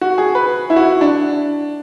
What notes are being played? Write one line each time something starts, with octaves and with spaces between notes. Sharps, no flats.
F#4
G#4
B4
E4
F#4
D4